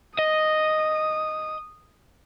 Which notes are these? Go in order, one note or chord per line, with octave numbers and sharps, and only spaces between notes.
D#5 D#6